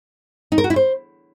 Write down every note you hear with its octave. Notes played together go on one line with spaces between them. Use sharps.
D#4
A#4
F#4
E4
C5